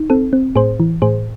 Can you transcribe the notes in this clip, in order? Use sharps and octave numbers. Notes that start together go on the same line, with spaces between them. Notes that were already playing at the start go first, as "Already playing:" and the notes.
Already playing: D#4
C4 A4
C4
A2 G#4 C5
E3
A2 G#4 C5